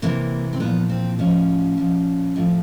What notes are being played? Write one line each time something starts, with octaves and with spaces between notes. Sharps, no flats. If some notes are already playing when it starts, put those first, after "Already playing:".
C3 E3 A#3
C4
A#2 F3 B3
C4
A2 F3 C#4
A#2 F3
A2 F3